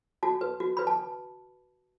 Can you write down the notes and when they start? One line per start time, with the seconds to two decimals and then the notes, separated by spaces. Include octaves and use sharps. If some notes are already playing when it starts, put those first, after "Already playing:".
0.23 F#4 A5
0.41 B4
0.60 F#4
0.77 B4 B5
0.87 A5